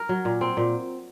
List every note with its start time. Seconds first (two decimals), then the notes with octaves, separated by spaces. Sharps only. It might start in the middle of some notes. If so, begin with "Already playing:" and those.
Already playing: A#4
0.09 F#3
0.25 A#2
0.41 C4
0.57 A#2